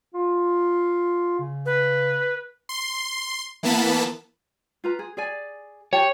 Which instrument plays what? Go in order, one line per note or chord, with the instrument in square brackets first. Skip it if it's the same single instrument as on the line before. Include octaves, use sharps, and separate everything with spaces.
[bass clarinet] F4
C#3
[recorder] B4
[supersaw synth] C6
E3 A#3 B3 A5 B5
[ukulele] F4 B4 A#5
G#4
G#4 D5 G#5
[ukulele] G4 G5 A5 [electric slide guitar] C#5